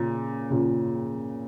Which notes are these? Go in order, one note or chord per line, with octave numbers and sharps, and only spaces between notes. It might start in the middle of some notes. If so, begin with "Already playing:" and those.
Already playing: A#2 C#3
A#2 C#3